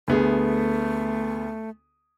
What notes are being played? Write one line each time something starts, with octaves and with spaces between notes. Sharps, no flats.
D2 A3 B3 G#4